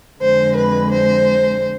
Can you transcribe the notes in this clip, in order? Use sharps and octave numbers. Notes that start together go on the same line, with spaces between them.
F2 D3 G#3 C5
B4
C5